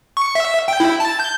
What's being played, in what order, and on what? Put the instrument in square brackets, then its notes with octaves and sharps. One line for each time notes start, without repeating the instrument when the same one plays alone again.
[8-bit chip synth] C#6
E5
G5
E4
A5
G6